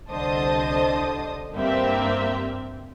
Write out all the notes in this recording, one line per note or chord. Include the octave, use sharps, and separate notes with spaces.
C2 D3 C5 D#5 A5 D#6
G2 A#3 C4 G4 E5